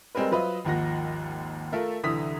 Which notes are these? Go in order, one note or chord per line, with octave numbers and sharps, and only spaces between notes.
G3 G#3 C4 G#4 A#4 B4
F#3 F4 B4 C5 D#5 E5
G#1 D#2 F3 F#5 A#6
A3 F4 A4 A#4 E5
C2 D3 E3 D#6 B6